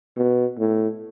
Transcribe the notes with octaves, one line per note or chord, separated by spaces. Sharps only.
B2
A2